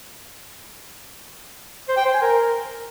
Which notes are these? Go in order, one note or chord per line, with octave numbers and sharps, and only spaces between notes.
C5
G5
C5
G#5
A#4